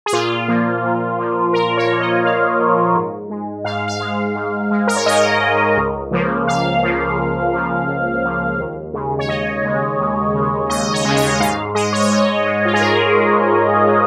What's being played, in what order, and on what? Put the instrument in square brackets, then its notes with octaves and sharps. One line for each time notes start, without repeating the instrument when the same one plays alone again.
[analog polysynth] G#4
A#2 F4
F3 A#3
A#2
F3 A#3
A#2 A#4
C#5
F3 A#3
D#5
A#2 F5
F3 A#3
G#2
G#3
G#2 F5
F5
G#3
G#2
G#3
A#4
C#5
G#2 D#5
G#3
C#2
C#3 F3 A#3
C#2 F5
C#3 F3 A#3
C#2
C#3 F3 A#3
C#2
C#3 F3 A#3
D#2
C#3 G#3
C#5
D#2 D#5
C#3 G#3
D#2
C#3 G#3
D#2 D#5
C#5
C#3 G#3
D#5
G#2 F5
G#3 D#5
C#5
D#5
G#2 C#5
G#3
F4
G#4
G#2 A#4
G#3
G#2
G#3